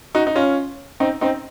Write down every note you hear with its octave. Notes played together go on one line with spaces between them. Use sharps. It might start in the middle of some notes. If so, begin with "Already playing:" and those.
D#4 F#4
D#4
C#4 F4
C4 D#4
C4 D#4